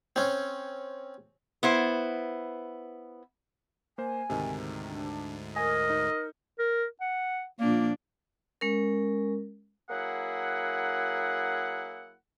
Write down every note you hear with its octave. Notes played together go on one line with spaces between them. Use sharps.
C4 C#4
B3 E4 C5
A#3 C5 G#5
D2 G#2 C3 D#3
D4
A#4 D#5 G#5 D#6
D#4
A#4
F#5
A#2 F3 A#3 D4
G#3 C#4 A#4
F#3 A#3 E4 G#4 F#5